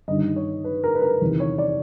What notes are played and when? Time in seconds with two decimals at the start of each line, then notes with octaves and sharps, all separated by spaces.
0.08 G1 G2 D#3 D#5
0.36 C#5
0.64 B4
0.84 A#4
0.95 B4
1.02 A#4
1.21 E2 C3 D#3
1.40 C#5
1.58 D5